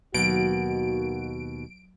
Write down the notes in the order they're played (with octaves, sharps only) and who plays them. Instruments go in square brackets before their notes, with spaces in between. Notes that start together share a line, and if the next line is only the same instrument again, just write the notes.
[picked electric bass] D#2 B2 [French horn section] D#3 A#3 F#4 [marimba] F#3 [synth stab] D7